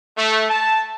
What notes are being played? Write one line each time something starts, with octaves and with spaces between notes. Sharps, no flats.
A3
A5